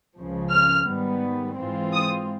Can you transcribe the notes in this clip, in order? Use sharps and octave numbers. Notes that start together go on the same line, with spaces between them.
C#2 C#3 F3
F6
G#2 D#3 G3 B3
G#2 E3 G#3 C4 F4
D#6